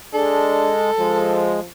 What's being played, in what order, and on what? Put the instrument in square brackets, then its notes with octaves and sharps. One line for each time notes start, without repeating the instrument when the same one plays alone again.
[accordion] G#3 [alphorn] D4 [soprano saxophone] A4
[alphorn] F3 [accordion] G#3